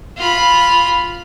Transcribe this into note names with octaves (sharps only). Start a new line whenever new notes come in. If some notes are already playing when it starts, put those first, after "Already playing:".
F4 B5